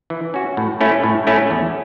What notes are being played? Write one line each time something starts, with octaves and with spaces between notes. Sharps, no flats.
E3
C#4 F#4
A2
A3 C#4 E4
A2
A3 C#4 E4
E2